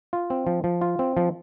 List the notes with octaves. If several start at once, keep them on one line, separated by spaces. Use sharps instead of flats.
F4
C4
F3
F3
F4
C4
F3